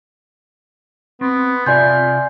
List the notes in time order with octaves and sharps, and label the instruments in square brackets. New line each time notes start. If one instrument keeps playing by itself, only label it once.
[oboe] B3 [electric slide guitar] C4
[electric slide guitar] C3 F4 E5 [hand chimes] D5 G#5 G6 [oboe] C6